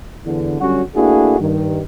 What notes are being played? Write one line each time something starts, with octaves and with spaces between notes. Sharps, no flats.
E2 D3
D3 F#3 G3 C#4 F#4
A3 A#3 D4 E4 F#4 G#4
G2 D#3